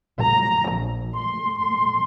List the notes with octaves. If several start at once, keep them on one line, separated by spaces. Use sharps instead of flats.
A#5
A#1
C6
C6